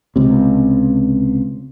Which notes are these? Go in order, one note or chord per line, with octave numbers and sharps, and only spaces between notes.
C#2 C3